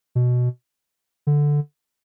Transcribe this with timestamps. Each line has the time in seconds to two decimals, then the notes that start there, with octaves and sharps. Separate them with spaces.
0.15 B2
1.27 D3